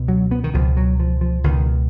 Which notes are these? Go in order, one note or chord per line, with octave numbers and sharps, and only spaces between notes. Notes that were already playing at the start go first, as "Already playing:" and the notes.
Already playing: C#2 B2
F#3
B3
D#3
C#2 B2 F3
F#3
F3
F3
C#2 B2 D#3